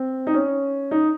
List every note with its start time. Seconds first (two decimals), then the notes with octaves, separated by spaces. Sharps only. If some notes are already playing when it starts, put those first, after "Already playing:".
Already playing: C4
0.27 D#4
0.34 C#4
0.91 D#4